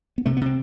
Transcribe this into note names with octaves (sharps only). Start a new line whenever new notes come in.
B3
C3 A3
B3
C3 C4